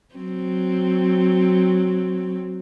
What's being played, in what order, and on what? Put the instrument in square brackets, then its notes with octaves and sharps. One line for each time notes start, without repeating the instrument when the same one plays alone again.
[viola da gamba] F#3 C4